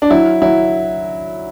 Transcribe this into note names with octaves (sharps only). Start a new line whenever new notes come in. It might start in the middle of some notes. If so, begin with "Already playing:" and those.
D4
F#3 E4
F#3 E4